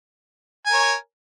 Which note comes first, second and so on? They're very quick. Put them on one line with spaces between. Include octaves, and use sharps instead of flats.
G#5 A#4 C#5